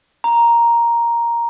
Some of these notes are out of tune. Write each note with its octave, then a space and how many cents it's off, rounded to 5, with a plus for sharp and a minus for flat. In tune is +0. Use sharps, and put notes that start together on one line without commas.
A#5 +5